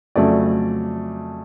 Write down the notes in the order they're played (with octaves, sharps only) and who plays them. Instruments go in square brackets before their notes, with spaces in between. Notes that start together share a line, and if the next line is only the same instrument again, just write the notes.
[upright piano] F2 C#3 F#3 A3 D5